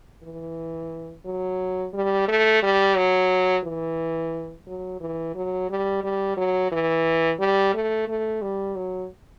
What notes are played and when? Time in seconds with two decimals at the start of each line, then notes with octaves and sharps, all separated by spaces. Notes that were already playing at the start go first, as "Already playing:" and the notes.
0.23 E3
1.25 F#3
1.93 G3
2.28 A3
2.62 G3
2.97 F#3
3.64 E3
4.67 F#3
5.00 E3
5.35 F#3
5.69 G3
6.03 G3
6.37 F#3
6.71 E3
7.39 G3
7.74 A3
8.08 A3
8.42 G3
8.76 F#3